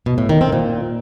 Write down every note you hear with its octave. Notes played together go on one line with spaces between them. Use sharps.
B2
A2
D#3
C4
A#2